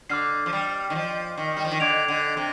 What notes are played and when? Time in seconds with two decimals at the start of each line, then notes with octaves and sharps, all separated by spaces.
0.10 D3 D6 F6 C7
0.46 F3
0.53 G3
0.90 D#3
0.95 F3
1.38 D#3
1.57 G3
1.65 F3
1.72 D#3
1.80 D3 D6 G#6 D7 F7
2.08 D3
2.37 C3